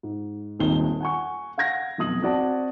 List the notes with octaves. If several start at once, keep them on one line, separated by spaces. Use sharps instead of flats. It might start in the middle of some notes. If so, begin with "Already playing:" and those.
G#2
D#1 G#1 D#2 D#4 G7
F#5 G#5 C#6
F5 F#5 G#6 A#6
F1 B1 D#6 F#7
C4 F#4 D5 A5